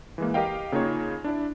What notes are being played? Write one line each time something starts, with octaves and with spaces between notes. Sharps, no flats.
E3 G#3 A#3
G4 A#4 D#5 F5 G5
C#3 A#3 D#4 F4 C#5
D4 E4 D5